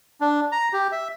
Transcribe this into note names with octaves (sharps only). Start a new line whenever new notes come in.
D4
A#5
G4
E5